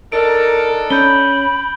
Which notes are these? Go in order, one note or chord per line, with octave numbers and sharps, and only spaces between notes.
D4 D#4 A4 A#4 D7
C#4 B5 G6 G7